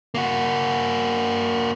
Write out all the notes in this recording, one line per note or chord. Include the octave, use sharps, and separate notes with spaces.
A#3 F#4